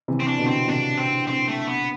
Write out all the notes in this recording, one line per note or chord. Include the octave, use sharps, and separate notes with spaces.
C3 E3
C4
D4
B2 D3
C4
A2 C3 D4
C4
C4
A3
B3